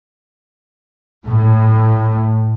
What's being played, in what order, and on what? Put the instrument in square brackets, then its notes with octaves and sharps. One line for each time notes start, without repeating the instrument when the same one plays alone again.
[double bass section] A2